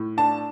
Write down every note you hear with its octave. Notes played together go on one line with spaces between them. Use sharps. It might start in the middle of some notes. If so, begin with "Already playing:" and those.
Already playing: A2
D4 A5